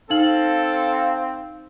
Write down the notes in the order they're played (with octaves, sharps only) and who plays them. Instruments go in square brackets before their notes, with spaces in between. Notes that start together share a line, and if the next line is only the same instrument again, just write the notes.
[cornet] C4 [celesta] D#4 F#7 [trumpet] A4 [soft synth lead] F5